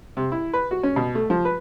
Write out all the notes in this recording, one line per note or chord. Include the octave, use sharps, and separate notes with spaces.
C3
E4
B4
F#4
C#4
B2
A3
F3
B4